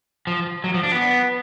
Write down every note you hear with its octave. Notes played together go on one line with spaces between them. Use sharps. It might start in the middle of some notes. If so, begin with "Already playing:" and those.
F3
F#3
F3
D4
B3